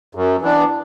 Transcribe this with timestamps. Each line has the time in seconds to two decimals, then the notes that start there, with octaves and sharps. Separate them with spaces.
0.15 F#2
0.42 E3 B3 D4